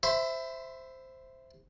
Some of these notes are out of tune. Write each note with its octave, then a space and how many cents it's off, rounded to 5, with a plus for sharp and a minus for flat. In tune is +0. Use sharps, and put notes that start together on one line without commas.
C5 +0 E5 +0 B5 +30